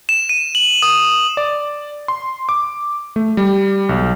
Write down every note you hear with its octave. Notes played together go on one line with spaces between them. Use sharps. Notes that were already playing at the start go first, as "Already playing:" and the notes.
E7
D#7
F#7
D#6
D5
C6
D6
A3
G3
B1